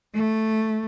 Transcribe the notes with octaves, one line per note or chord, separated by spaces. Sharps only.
A3